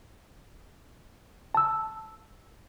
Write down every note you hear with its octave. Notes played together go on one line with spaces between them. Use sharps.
A5 E6